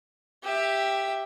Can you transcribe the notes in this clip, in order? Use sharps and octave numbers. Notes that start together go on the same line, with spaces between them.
G4 E5